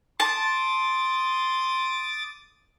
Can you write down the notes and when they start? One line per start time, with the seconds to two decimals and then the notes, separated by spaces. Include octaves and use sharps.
0.20 A5 C6 D6 D#6 A6